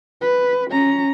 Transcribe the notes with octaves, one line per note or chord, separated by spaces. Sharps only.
B4
C#4 A#5